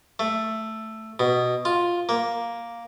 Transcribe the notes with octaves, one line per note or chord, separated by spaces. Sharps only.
A3
B2
F4
A#3